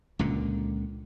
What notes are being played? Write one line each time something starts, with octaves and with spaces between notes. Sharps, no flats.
C#2 A#2 D3